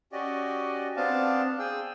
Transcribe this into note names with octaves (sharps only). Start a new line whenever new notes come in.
C#4 F#4 G4 D5 D#5
B3 C4 D4 F5 A5
G#4 G5 E6